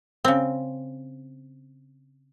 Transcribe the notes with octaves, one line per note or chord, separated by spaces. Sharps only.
C#3 C4